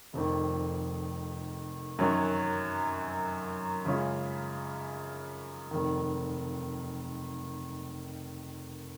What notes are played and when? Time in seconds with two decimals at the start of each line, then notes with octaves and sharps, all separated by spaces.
0.13 F1 F2 D#3
1.99 F#2 D#3 F#3 C#4
3.85 F#2 C#3 G#3 C#4 F4
5.71 F1 D#2 D#3